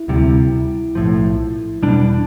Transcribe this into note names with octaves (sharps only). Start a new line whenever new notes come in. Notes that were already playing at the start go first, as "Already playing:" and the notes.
Already playing: E4
D2 C3 G3
B1 A2 F3
E2 B2 G3 D4